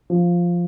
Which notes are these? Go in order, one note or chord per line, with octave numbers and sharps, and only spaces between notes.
F3